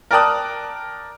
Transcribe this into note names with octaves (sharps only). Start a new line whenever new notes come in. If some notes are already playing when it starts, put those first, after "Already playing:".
A#4 D5 G5 A5 D#6 F#6